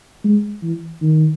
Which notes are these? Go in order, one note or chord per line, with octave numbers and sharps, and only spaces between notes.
G#3
E3
D#3